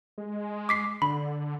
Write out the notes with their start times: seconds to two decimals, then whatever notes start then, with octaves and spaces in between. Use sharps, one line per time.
0.18 G#3
0.69 D6 B6 C7
1.02 D3 B5